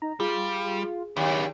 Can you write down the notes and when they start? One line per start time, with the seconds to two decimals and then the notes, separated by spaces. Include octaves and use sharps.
0.02 D#4 A#5
0.20 G3 F4 G#4
1.17 D#2 D4 E4